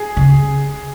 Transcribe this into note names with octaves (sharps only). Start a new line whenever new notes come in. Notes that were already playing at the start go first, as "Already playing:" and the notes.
Already playing: G#4
C#3